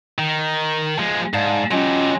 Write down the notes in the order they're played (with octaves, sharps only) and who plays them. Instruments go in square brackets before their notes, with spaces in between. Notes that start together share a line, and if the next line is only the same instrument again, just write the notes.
[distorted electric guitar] D#3
F3 G#3
[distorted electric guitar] G#2 [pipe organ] D5 F5 A5
[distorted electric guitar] F#3 G4 [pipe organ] C#4 F4 D#5